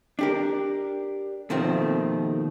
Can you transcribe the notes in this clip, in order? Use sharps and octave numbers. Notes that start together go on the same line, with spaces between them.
D4 G4 A#4
D#2 B2 D#3 F3 A3 C4